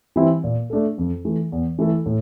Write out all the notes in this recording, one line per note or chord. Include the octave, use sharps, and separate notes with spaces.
E3 G3 C4 E4
A#2
A3 D4 A4
F2
E3 A3
E2
E3 A3 E4 A4
A2